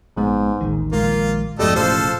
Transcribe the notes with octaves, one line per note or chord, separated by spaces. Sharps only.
A#1 G#2 G#3 B3
A1 D#2 D#3
A#1 D#3 G#3 A#3 F4
F2 G#2 B2 G3 A3 A4 D#5
E1 A2 C#3 F3 A4 C5 F5